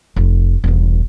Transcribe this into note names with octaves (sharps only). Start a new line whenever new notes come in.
F1
E1 C2